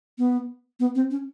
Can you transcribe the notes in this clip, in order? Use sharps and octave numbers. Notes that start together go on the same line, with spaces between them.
B3
B3
C4
C#4